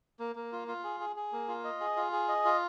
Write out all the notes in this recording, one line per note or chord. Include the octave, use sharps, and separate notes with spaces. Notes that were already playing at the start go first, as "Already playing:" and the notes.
A#3
A#3
F4
F4
G#4
G#4
G#4
A#3
F4
D#5
G#4
F4
G#4
D#5
F4